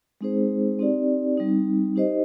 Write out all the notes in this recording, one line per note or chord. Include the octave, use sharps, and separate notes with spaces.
G#3 C4 D#4 G#4 C5
C4 D#4 G4 D5
G3 C4 D#4
D#4 G4 C5 D#5